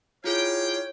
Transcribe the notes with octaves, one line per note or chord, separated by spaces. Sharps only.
E4 F4 G#4 C#5 F5 G5